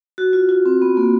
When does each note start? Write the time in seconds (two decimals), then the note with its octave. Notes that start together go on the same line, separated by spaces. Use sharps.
0.18 F#4
0.33 F4
0.49 F4
0.66 C4
0.82 B3
0.97 A#3